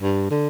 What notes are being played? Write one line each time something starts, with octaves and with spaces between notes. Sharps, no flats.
G2
D3